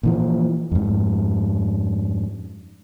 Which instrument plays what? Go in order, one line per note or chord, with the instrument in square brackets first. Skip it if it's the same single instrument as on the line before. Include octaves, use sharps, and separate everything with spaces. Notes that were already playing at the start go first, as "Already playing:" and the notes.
[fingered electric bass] A#2 E3 F3
F2 G#2